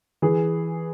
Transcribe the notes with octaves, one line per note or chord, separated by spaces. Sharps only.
E3 G#4